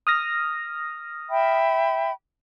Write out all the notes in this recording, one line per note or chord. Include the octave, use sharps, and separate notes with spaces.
D#6 F6 A#6
E5 G5 B5